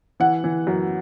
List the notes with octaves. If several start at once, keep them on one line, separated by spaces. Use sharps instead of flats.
E3 F#5
E3
F#2